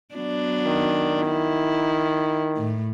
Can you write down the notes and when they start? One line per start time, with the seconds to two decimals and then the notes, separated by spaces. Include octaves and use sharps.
0.15 F#3 B3 D4
0.67 D#3
1.27 E4
2.57 A2